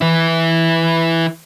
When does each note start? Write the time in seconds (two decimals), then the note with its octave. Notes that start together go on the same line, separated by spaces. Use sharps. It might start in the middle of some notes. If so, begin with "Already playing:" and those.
0.01 E3 E4